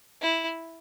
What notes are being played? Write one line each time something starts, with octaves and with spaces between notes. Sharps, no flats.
E4